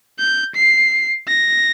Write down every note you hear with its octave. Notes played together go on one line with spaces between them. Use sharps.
G6
C7
A#6